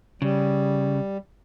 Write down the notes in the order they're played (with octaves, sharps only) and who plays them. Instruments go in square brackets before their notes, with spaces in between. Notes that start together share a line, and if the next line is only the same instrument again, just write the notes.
[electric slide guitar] C#3 [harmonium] G3